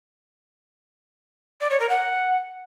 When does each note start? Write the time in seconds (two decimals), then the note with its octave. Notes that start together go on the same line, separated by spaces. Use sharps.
1.60 D5
1.70 C#5
1.79 A#4
1.89 F#5